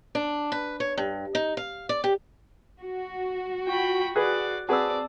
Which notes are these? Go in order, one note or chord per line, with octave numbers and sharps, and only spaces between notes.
D4
B4
C#5
G2
D#4
F5
D5
G4
F#4
F4 G5 B5 C#6
G#4 B4 D5 F#6
C4 F#4 G#4 B4 D5 A5 E6